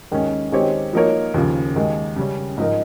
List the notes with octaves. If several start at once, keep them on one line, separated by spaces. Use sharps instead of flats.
D#2 D#3 G#3 C#4
D#3 G#3 C4 G4 C#5
F3 A#3 D#4 A#4 C#5
D#2 C#3 F3
D#2 D#3 G#3
C#3 G3 C#4
G#2 F3 G#3 D#4 A#4